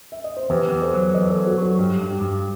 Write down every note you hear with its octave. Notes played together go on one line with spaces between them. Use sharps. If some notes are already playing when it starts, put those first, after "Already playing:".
E5
D#5
C5
E2 G4 B4
E2
A4 C5
F#3
E2 B4 D#5
A4 C5
F#3
F#4 A4
F#3 F#4 A4
G2 G4
G2
G4
G2